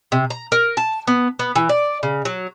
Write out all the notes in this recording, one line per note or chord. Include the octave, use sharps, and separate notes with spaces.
C3
A#5
A#4
A5
B3
B3
E3
D5
C#3
F#3